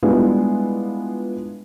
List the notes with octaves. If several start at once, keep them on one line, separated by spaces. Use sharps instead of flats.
G3 G#3 B3 D4 E4 F4